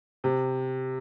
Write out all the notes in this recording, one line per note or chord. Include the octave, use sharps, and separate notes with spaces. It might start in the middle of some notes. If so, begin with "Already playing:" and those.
C3